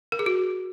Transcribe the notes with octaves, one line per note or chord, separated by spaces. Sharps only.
A#4
G#4
F#4